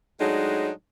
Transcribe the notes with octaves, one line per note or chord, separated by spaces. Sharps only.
A2 F#3 G#3 D4 D#4